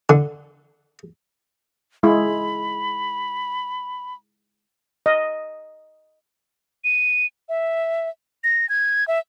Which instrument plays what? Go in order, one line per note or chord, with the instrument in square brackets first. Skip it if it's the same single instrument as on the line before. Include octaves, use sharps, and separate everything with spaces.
[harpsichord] D3
[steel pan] G#3 E4 [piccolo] B5
[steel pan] D#5
[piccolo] D#7
E5
A#6
G#6
E5